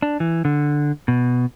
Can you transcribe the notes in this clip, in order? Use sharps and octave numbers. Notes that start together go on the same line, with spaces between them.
D4
E3
D3
B2